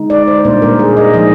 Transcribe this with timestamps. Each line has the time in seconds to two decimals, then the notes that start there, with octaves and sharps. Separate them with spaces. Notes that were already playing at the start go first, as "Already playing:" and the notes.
Already playing: D3 G#3 D#4
0.10 D5
0.27 C5
0.44 A#2 G3 A#3 D4 C5
0.62 A#4
0.79 G#4
0.97 D#5
1.14 F3 G#3 D#4 D#5